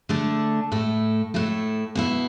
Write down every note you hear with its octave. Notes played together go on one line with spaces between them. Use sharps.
D3 A3 D4
A2 A3 E4
A2 A3 E4
B2 B3 E4